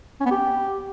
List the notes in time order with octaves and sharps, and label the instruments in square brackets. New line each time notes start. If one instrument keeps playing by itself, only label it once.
[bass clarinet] C#4
B3
G4